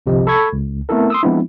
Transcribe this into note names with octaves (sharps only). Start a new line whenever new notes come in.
G1 C2 C3 F3 G4 D#5
A4 B5 C#6 G#6
C#2
A3 B3 C4 E4 A4 A#4
C6 D#6 E6
F3 G#3 B3 C4 D4 E4